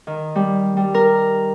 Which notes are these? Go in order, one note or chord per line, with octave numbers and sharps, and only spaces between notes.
D#3
G3
G3
A#4